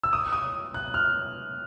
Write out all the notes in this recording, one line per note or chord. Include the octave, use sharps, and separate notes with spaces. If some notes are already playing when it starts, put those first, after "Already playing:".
E6
D#6
D#6
F#6
F6